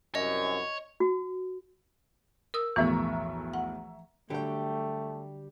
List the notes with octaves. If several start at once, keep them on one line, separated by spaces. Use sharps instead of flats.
C2 F#2 C#5 D#5
F#4
A#4 D#6 E6
B1 E2 A2 E3 F3 E5 A#5 C#6
F#5
D3 F#3 G3 A3 G4 G5